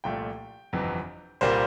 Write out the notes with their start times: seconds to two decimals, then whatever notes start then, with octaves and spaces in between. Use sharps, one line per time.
0.04 C2 A#2 F3 A3 G5
0.73 G1 F2 C3 E3
1.41 C2 A#2 G3 A#3 C5